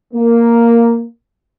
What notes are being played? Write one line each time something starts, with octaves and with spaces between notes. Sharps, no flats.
A#3